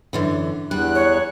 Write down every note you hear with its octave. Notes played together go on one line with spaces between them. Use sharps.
F#2 D3 E3
E2 G3 F#6
C#5